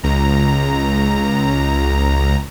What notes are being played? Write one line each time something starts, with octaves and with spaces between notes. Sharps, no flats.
C#2 A#5